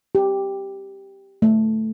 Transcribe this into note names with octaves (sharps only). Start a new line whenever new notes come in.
G4
A3